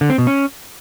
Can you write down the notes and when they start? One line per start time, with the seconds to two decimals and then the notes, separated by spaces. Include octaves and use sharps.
0.01 D3
0.10 C4
0.18 B2
0.27 C#4